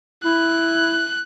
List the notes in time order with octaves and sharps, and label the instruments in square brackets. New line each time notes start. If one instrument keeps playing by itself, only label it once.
[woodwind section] E4 [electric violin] F#6